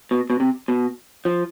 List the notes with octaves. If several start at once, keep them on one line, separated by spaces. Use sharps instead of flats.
B2
B2
C3
B2
F3